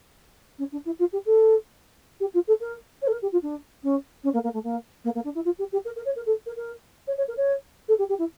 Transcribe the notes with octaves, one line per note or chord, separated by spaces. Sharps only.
C#4
D4
E4
F4
G4
A4
G4
F4
A4
A#4
C#5
A4
A#4
G4
F4
D4
C#4
C#4
A#3
A#3
A3
A#3
A#3
A#3
D4
E4
F4
G4
G4
A#4
A#4
C#5
A#4
A4
A#4
A#4
C#5
C#5
A#4
C#5
A4
G4
G4
E4